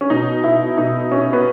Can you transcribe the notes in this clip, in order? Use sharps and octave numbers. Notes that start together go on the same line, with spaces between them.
C#4
B2 D#4
B2 E4
B2 D#4
B2 C#4
B3